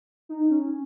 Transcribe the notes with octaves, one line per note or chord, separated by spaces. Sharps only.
D#4
C#4